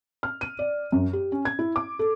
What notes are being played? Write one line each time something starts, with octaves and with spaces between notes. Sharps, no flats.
F6
D#7
D5
F#2
G4
C#4
G#6
E4
D6
A4